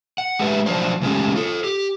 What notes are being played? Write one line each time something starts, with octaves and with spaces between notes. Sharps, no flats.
F#5
G#3 G4 B4 E5
F3 F#3 D4 C5
C#3 G#3 A3 C4 C#4 G4
F4 A4
G4